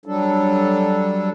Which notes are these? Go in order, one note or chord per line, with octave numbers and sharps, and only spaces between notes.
F#3 G3 D4 A4